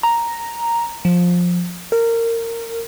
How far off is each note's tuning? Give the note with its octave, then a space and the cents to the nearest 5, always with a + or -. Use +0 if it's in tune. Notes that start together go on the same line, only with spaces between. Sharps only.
A#5 +0
F3 +15
A#4 -20